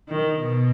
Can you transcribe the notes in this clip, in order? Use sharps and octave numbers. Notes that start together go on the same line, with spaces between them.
D#3
B2